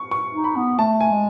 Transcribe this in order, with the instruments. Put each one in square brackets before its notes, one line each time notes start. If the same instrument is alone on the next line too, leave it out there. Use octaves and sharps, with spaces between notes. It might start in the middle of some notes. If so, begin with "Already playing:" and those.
Already playing: [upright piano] C#6
C#6
[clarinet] D#4
[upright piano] B5
[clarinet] B3
[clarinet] A3 [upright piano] A5
[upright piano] G#5
[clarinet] G#3